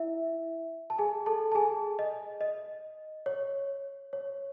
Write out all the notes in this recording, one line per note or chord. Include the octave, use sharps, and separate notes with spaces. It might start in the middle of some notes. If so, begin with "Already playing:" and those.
Already playing: E4 E5
A5
G#4 G#5
A4 A5
A5
G#4 G#5
D#5
D#5
C#5
C#5